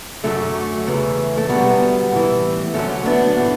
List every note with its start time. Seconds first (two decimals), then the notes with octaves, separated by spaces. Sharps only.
0.23 F#2 D3 F#3 A3 C#4
0.87 E2 C#3 E3
1.37 A3
1.48 D2 D3 F#3 G3 B3
2.11 A2 E3
2.74 D2 D3 F#3 A3 C#4
3.06 B3 D4
3.36 A2 E3